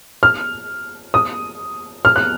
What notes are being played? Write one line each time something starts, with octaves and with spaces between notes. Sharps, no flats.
F6
D#6
F6
F#6